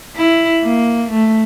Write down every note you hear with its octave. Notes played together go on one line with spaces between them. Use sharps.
E4
A#3
A3